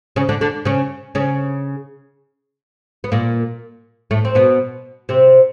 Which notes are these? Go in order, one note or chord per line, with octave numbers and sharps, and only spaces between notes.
C#3 C#4
D3 D4
D3 D4
C#3 C#4
C#3 C#4
B3
A#2 A#3
A2 A3
C4
B2 B3
C3 C4